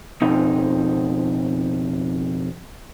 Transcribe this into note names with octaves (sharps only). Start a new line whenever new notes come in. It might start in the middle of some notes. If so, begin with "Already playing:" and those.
F2 B2 C4 D#4